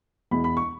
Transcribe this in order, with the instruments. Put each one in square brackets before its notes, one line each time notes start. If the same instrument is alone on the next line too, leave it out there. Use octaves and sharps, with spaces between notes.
[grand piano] E2 B2 G#3 B3 E4 B5
B5
C#6